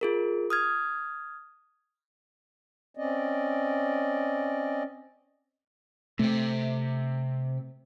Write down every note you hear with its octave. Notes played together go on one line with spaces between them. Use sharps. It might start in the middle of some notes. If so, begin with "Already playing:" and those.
F4 G#4 A#4
D#6 F6 G#6
C4 C#4 D5 D#5
C3 A3 C4